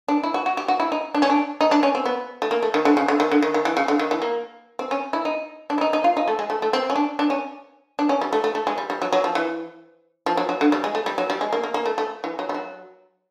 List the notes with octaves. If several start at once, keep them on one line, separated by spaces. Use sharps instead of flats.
D4
E4
F#4
F#4
G4
F#4
E4
D#4
D4
C#4
D4
D#4
D4
C#4
C4
B3
A3
A#3
A3
D#3
D3
C#3
D3
D#3
D3
D#3
D#3
E3
C#3
D3
D#3
E3
A#3
C4
C#4
E4
D#4
D4
E4
D#4
D#4
F4
D#4
A3
G#3
A3
A3
C4
C#4
D4
D4
C#4
D4
C#4
G3
A3
A3
A3
G#3
G3
G3
F#3
F#3
F3
E3
F3
F#3
F#3
D3
G3
G#3
A3
G3
F#3
G3
G#3
A#3
A#3
A#3
A3
A3
E3
F#3
G3
F#3